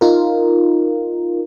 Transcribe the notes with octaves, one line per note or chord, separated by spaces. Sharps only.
D#4 F4 A#4